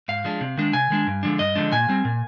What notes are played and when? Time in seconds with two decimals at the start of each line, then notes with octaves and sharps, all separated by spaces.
0.08 G#2 F5
0.24 F3 G#3 D4
0.41 C3
0.57 D#3 G#3 D4
0.73 C3 G#5
0.90 D#3 G#3 D4
1.07 G2
1.23 D3 F3 G#3 D4
1.39 G2 D#5
1.55 D3 F3 G#3 D4
1.72 A#2 G#5
1.89 G3 C4
2.05 A#2